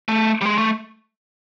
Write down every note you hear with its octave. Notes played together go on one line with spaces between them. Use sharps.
A3
G3
G#3
A3